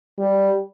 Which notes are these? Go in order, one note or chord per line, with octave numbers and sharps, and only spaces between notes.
G3